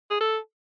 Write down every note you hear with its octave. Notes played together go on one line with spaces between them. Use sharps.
G#4
A4